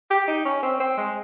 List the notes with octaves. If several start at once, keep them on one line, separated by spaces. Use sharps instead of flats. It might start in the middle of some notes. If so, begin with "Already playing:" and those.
G4
D#4
C#4
C4
C4
G#3